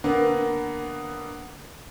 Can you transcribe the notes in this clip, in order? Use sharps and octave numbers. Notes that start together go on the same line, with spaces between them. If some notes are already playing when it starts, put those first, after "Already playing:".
D3 A#3 B3